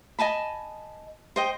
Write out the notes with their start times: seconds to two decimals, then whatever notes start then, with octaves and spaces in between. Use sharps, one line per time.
0.19 D#5 G#5 A5 B5
1.36 C5 D#5 G5